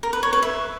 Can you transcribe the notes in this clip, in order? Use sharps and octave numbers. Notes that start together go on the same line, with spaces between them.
A#4
B4
C#5
B4
E5